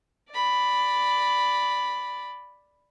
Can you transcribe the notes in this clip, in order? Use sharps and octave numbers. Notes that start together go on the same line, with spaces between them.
D5 B5